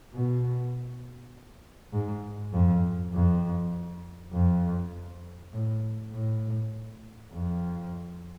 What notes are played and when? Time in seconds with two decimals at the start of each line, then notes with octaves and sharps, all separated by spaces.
0.14 B2
1.93 G#2
2.53 F2
3.13 F2
4.33 F2
5.53 A2
6.13 A2
7.32 F2